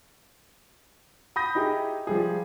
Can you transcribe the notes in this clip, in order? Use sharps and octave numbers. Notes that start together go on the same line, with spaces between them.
B5 D#6 G6 A#6
D#4 E4 G4 G#4 E5
F3 G3 G#4